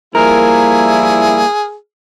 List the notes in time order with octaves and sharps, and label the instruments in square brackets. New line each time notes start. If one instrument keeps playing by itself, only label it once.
[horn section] F3 G3 E4 [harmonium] A#3 [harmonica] G#4 [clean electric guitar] A#4